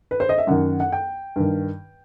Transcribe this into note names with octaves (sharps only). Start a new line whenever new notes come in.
B4
C5
D#5
E5
F#2 D#3 F#5
F#5
G5
G2 D#3